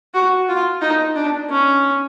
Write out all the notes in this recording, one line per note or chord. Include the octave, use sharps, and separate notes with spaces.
F#4
F4
D#4
D4
C#4